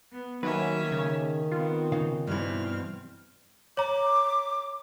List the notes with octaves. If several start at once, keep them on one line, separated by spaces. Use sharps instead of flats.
B3
D#3 F#3 A#3 C#4 B4 E5
C#3
B3 C4 F4
C#3 D#4 F5
G2 B2 E3 C4 E4 F6
C#5 A#5 D6